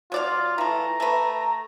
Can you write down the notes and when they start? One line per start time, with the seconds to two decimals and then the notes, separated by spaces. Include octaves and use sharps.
0.12 F#3 F4 D5 F5
0.58 E3 A3 A#5
1.00 A3 B4